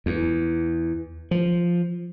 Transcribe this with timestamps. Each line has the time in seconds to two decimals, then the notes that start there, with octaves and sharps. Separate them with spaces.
0.06 E2
1.31 F3